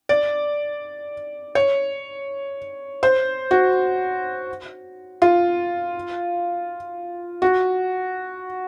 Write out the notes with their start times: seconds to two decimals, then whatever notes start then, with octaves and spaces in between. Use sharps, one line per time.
0.09 D5
1.55 C#5
3.03 C5
3.51 F#4
5.22 F4
7.42 F#4